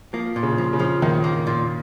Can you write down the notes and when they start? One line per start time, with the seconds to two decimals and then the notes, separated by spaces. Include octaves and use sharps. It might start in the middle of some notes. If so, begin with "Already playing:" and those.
0.13 F3 A#3
0.36 A#2
0.43 C#3
0.58 F3
0.73 C#3
0.79 F3
1.02 A#2 D#3
1.24 A#3
1.47 A#2